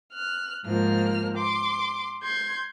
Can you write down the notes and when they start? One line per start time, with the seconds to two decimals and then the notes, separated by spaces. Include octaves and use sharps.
0.13 F6 F#6
0.66 G#2 F3 A#3 F6
1.37 C6 D6
2.23 C6 G6 G#6